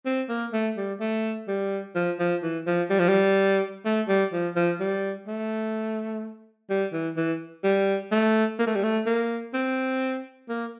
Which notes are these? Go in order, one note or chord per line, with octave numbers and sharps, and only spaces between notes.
C4
A#3
A3
G3
A3
G3
F3
F3
E3
F3
G3
F3
G3
A3
G3
F3
F3
G3
A3
G3
E3
E3
G3
A3
A#3
A3
G3
A3
A#3
C4
A#3